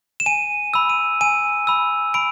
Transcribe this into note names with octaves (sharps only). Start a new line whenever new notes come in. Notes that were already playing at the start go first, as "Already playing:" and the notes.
E7
G#5 D#7
B5 E6
D#7
G#5 D#7
B5 E6
B5 D7